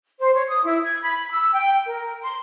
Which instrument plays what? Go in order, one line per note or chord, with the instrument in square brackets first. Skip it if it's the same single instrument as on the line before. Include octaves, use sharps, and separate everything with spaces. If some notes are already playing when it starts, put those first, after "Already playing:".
[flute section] C5
C#5
D#6
E4
G#6
B5
E6
G5
A#4
C6